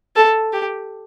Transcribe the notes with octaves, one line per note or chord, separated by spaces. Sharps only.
A4
G4